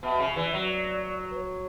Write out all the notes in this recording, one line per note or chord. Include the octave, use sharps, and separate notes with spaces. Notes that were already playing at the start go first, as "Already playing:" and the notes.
B2 E5
C#3
E3 D5
E5
F#3 D5
B4
C#5